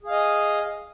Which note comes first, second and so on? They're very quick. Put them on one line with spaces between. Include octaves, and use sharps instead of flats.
G#4 F5 D#5